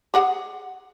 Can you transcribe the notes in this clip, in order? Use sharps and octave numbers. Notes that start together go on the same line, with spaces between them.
G4 G#4 F#5